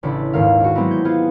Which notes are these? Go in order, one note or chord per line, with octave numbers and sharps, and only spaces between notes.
A1 C#3 D4 E4 A4
D#1 D#2 G#2 D#3 F5
D4 F#4
F#3 G#3 B3 C4 D#4 E4
G6 G#6
B3 F4 G#4